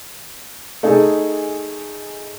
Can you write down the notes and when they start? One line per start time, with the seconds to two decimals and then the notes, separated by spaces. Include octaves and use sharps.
0.83 A3 D#4 G#4